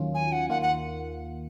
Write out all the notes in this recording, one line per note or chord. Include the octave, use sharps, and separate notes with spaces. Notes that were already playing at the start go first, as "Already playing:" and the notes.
Already playing: D#2 D#3 F#3 C#4 F4
G#5
F#5
D#2 D#3 A#3 F4 F#5
F#5